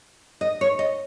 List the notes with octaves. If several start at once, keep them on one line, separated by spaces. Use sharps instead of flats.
D#5
C#5
D#5